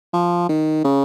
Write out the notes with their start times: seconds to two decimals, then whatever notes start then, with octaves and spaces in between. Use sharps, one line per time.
0.13 F3
0.49 D#3
0.84 C#3